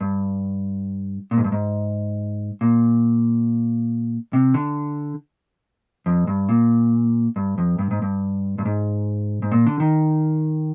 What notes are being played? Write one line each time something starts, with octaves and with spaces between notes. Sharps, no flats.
G2
A#2
G#2
G2
G#2
A#2
C3
D3
F2
G2
A#2
G2
F2
G2
G#2
G2
G2
G#2
G#2
A#2
D3
D#3